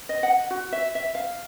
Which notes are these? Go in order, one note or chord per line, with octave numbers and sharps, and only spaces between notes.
D#5
F#5
F#4
E5
E5
F5